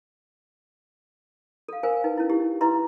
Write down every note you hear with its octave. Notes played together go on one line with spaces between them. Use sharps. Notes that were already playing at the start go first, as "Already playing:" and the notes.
A4 F5
A#4 C5 F5 G#5
D#4 B4
C#4 E4
E4 G4
E4 B4 E5 A#5 C6